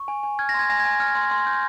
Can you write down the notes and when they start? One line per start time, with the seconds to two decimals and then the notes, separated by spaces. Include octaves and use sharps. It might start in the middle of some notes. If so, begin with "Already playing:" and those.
Already playing: C#6
0.08 G#5
0.23 G#5
0.39 F6 G#6
0.49 A#6
0.54 C6
0.59 G#6
0.70 G#5 A#6
0.80 G#6
0.85 G#5
1.00 F6 G#6
1.15 C6
1.31 C6
1.46 G6